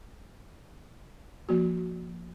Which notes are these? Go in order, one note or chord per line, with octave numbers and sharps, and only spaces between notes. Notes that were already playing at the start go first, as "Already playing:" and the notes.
F3 A#3 F#4